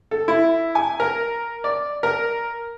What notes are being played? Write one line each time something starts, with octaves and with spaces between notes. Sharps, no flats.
A4
E4
G#5
A#4
D5
A#4